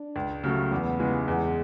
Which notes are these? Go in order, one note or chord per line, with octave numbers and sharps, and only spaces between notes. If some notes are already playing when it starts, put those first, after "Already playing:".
Already playing: D4
C#2
C#3 F#3 A3
E2 B3
C#3 E3 G#3
E2 G#3